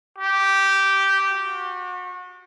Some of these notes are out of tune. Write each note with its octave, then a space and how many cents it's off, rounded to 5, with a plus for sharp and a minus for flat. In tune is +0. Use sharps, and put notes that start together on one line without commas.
G4 -10
F#4 -30